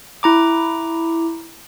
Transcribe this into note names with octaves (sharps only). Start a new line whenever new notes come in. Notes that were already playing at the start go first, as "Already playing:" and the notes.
E4 A#5 D6